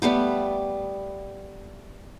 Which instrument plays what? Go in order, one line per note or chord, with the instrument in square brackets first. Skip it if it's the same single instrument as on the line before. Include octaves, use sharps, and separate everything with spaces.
[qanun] G3 A3 B3 G4